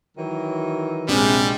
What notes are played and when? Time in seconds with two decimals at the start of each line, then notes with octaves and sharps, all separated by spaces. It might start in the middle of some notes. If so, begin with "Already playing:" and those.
0.17 D#3 E3 F#3
1.08 A#1 C3 G3 G#3